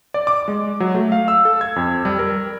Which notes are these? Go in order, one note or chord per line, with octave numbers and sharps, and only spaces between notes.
D5
D6
G#3
F#3
A3
F5
E6
A4
G#6
F2
G3
A#4